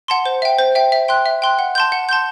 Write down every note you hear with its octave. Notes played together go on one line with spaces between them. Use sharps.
F#5 A5 C6
C5
E5 G5
C5
E5 G5
E5
G5 C6 F#6
E5
G5 C6 F#6
F#5
A5 C6 G6
F#5
A5 C6 G6